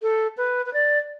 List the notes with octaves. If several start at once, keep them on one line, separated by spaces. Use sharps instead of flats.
A4
B4
B4
D5